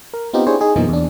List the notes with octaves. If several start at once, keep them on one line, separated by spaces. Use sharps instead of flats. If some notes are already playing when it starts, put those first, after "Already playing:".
A#4
B3 C4 D#4 F4 G4
D4 E4 G4 G#4 C5 C#5
D#4 G#4
F#2 B2 E3 F3 A#3 D#4
E2 D4